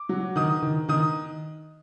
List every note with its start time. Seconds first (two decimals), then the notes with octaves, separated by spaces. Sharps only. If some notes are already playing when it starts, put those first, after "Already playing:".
Already playing: D6
0.09 F#3
0.36 D#3 D#6
0.62 D#3
0.89 D#3 D#6